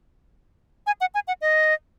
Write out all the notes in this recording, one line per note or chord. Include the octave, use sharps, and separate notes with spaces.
G#5
F#5
G#5
F#5
D#5